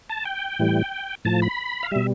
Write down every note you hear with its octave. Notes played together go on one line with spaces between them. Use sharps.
A5
G5
A2 E3 G3
A2 F3 A5
B5
F5
B2 G3 E5